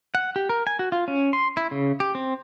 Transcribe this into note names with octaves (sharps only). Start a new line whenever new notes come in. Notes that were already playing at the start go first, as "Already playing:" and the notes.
F#5
G4
A#4
G#5
F#4
F4
C#4
C6
E4
C#3
G4
C4